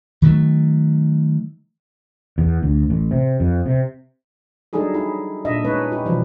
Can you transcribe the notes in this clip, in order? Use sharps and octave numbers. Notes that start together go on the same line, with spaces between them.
D#3 F#3 A3
E2
D2
A1
C3
F2
C3
F#3 G3 D4 D#4 G#4 A4
D#4 E4
A#2 D4 D#5 E5
G#3 C#4 D#4 B4 C#5
E4 G4
B2 E3 F3 G3